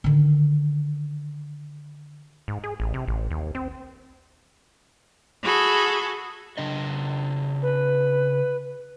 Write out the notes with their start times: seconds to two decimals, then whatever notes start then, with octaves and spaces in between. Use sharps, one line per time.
0.04 D3 D#3
2.48 G#2
2.64 G#4
2.80 A1
2.94 C3
3.08 A1
3.31 D#2
3.55 C4
5.43 F#4 G#4 A4 B5
6.58 C#3 D4 D#5
7.62 B4